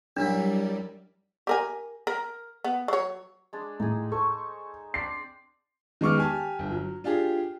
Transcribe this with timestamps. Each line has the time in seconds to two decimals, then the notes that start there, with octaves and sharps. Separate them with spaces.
0.17 F#2 F#3 G3 D4 E4
1.47 G4 A#4 G#5
2.07 A#4
2.64 B3
2.88 F#3 C#5
3.53 G#3 D4
3.80 A2 D#4 G#4
4.12 A4 C5 C#6
4.94 C4 D4 D5 C7
6.01 D#3 G#3 B3 C#6 D6 F6
6.18 G4 G#5 A5
6.59 G1
6.71 F#3
7.04 D4 F4 G4 G#4